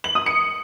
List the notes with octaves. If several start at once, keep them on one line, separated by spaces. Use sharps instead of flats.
F#7
D#6
C#7